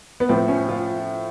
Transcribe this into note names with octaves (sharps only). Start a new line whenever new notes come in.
B3
A2 F3 C4
C#4
F4